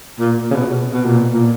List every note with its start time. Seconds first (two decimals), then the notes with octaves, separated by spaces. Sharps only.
0.19 A#2
0.51 C#3
0.55 B2
0.92 B2
1.06 A#2
1.32 A#2